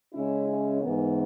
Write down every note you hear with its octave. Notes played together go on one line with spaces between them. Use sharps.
C#3 G#3 C#4 E4
E4
G#2 E3 B3 A#4